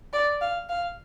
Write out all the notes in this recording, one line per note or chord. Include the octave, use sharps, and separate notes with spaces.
D5
F5
F5